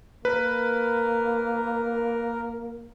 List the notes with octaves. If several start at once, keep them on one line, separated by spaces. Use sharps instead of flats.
A#3 A#4 B4